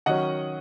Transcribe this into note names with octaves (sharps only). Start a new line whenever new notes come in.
D#3 F#3 C#4 D#5 F#5